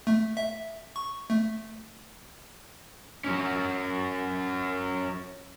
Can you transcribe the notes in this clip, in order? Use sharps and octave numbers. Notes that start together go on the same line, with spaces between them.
A3
E5
C#6
A3
F#3 C#4